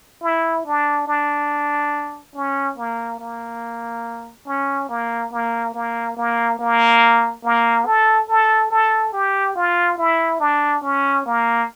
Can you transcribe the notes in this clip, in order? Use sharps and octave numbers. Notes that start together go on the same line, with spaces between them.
E4
D4
D4
C#4
A#3
A#3
C#4
A#3
A#3
A#3
A#3
A#3
A#3
A4
A4
A4
G4
F4
E4
D4
C#4
A#3